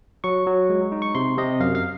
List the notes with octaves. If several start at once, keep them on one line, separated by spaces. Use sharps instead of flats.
F#3 C#6
F#3
G#3
D#4
C#6
C3 C6
C3 D#5
F#2 F5
F5